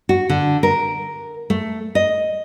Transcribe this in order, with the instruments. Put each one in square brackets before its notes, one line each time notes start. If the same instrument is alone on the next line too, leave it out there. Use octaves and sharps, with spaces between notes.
[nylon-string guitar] F#4
D3
A#4
A3
D#5